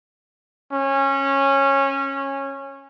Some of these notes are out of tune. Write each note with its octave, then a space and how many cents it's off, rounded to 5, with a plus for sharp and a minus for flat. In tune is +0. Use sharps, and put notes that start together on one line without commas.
C#4 -15